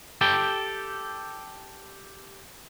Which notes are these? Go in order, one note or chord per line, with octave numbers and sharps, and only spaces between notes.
G4 A4 G5